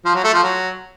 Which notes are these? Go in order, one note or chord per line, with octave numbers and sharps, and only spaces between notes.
F3
F#3
A3
F3
F#3